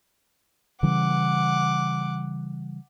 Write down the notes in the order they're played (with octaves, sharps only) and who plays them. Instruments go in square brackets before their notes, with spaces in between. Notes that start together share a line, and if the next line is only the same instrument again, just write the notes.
[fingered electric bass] C#3 E3 G3 [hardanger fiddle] F#5 D6